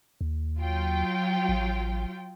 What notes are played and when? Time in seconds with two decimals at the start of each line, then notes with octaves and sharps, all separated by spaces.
0.21 D#2
0.59 F#3 F4 G5
1.49 A1